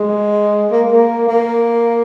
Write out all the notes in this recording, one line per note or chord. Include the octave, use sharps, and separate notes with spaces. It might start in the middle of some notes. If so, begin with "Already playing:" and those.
Already playing: G#3
A#3
A#3
A#3